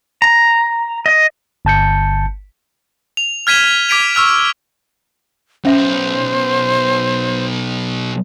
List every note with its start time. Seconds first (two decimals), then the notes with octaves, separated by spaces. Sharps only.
0.22 A#5
1.06 D#5
1.65 G1 A5 G6 C#7
3.17 F7
3.47 F6 G#6 B6 D#7 E7 G7
3.89 D6 G#6 B6 D7 D#7 F7
4.15 C#6 E6 F6 F7
5.65 B1 C#4 C5 E5 G5